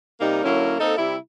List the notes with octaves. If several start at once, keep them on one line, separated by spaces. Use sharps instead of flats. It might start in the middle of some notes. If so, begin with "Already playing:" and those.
C3 G3 A#3 D#4
D3 F#3 A#3 C#4 E4
A#3 C4 D#4 A4
C3 G3 E4